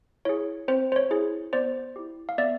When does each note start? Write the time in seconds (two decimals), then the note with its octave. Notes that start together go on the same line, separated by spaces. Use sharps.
0.25 E4 G#4 C#5
0.68 C4 C5
0.92 C5
0.96 C#5
1.11 E4 G#4
1.53 B3 C5 D5
1.96 E4 G4
2.29 F5
2.38 B3 D5 E5